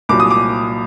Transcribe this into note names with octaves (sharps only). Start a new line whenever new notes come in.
C2 A#2 F#3 D6
D#6
D6